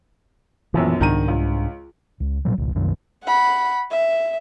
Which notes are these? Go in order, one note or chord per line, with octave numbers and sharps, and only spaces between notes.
A#1 F#2 B2 E3
C2 G#2 D#3 D4 A#5 D#7
C#2
C#2
A#2 F#3 G3
G#1 C#2
C2 F#2 D#3 D4
F#5 B5
E5